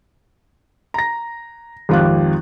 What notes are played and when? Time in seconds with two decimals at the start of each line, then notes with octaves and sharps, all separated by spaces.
0.94 A#5 A#6
1.89 G#1 F2 F4 G4 F#6